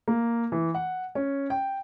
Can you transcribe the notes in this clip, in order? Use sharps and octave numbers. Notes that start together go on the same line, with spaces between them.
A#3
E3
F#5
C#4
G5